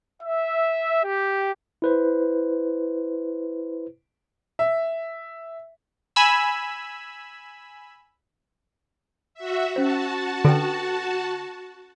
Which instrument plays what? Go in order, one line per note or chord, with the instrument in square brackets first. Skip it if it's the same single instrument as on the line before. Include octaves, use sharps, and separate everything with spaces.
[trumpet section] E5
G4
[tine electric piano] E4 B4 C5
[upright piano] E5
[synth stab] G#5 B5 E6
[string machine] F#4 E5
[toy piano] C#4 C5 [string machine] F#4 A5
[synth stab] D3 [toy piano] A4 B4 G5